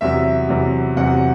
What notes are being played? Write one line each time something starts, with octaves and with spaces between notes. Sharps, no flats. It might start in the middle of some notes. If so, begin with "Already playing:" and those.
E2 C3 F#3 E5
E2 C3 F#3
E2 C3 F#3 F#5